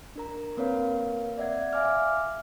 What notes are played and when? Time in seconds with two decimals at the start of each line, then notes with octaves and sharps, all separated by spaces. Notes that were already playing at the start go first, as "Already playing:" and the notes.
0.16 D4 A#4 A#5
0.57 A#3 C4 A#4 B4 C#5 F5
1.38 D5 E5 F#5 G#6
1.73 E5 F5 G#5 D6 F6